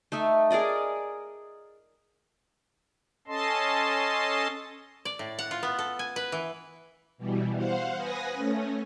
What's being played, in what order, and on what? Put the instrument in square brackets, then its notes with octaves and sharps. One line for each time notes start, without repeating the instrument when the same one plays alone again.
[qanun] A3 D#4 A4 E5
G#4 A#4 D5 D#5
[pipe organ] C#4 A4 D#5 A5 C6
[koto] D5
A2
F#5
F4
B3
A4
G#5
B4
E3
[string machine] B2 E3 G3
C5 F5 F#5
B4 G#5 D#6 A#6
A3 C#4